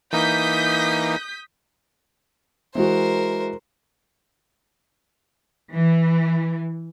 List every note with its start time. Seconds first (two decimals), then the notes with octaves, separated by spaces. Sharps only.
0.13 E3 A#3 D#4 D#6 G6 B6
2.75 E3 G#3 F#4 A#4 C5
5.71 E3